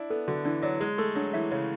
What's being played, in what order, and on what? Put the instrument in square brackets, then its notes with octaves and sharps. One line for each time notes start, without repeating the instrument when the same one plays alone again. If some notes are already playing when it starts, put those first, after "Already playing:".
Already playing: [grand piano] D4 E4
[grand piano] B3 [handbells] A4
[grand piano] D3 [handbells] F#4
[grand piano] E3 [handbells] D4
[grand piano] F#3 [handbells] D5
[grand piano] G#3 [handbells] C#5
[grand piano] A3 [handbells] A4
[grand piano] F#3 [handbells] D4
[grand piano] E3 [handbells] E5
[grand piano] C#3 [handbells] C#5